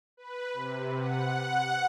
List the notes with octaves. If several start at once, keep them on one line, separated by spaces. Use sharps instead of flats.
B4
C3
F#5